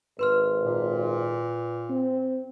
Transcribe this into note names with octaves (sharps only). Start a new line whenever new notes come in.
G#1 B4 C6 F6
A#2
C4